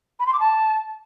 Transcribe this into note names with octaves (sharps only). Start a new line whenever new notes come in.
B5
C6
D6
A5